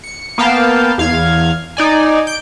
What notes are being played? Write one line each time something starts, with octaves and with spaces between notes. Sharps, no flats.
C#7
A#3 B3 F5 G5 A5
E2 F5 F6 G#6
D#4 D5 G#5
G6 D7